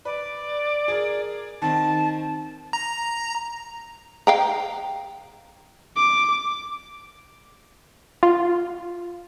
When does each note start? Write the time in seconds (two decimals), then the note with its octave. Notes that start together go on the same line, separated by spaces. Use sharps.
0.05 B4 D5
0.88 G#4 A#4
1.62 D#3 C4 A5
2.73 A#5
4.27 F5 G5 A#5
5.96 D6
8.23 F4